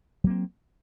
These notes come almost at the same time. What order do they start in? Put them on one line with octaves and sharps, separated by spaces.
F#3 A#3 C4